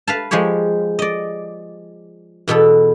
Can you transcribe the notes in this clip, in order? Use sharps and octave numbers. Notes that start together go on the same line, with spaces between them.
B4 F5 A5
F3 G#3 G4 G#4 C#5
D5 D#5
E2 B2 B3 A4